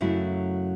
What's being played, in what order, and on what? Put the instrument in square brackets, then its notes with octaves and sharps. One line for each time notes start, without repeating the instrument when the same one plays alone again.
[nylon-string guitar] F#2 C#3 F#3 A3 E4